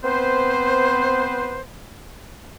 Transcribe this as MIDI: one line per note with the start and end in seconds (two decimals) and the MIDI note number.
0.04 1.60 59
0.04 1.60 60
0.04 1.60 71
0.04 1.60 72